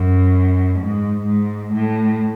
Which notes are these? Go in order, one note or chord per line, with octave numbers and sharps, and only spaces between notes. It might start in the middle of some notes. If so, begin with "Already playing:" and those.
Already playing: F#2
G#2
G#2
A2